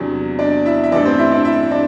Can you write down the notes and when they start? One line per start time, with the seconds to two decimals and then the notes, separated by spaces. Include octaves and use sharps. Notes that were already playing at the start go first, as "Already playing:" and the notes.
Already playing: E2 C3 F#3 D4
0.39 D4 D5
0.65 E4 E5
0.84 E5
0.92 A1 G2 E3 D4 D5
1.05 C4 C5
1.19 E4 E5
1.31 D4 D5
1.45 E4 E5
1.72 D4 D5